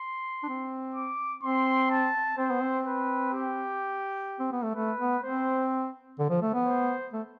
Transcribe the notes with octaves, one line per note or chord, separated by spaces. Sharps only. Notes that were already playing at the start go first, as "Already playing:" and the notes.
Already playing: C6
D4
C4
D6
C4 C6
A5
C4 C5
B3
C4
B4
G4
C4
B3
A3
A3 B4
B3
C4 C5
D3
F3
A3
B3
C5
A3